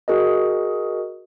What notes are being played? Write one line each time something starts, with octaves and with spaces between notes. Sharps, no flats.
F#4 G#4 A#4 D#5